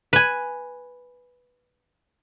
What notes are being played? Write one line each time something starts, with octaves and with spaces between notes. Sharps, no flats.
B4 G#5